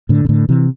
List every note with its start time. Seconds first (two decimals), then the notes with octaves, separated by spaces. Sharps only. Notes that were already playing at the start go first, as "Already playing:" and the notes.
0.09 A2 D3
0.25 C3
0.29 A2 D3
0.49 C3 E3